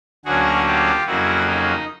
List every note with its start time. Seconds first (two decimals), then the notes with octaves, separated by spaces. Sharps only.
0.25 D2 D3 F#3 A#3 C#4 F#4 G#4
0.66 F4 G4
1.06 F2 C#3 F#3 A#3 E4 F#4
1.48 D#4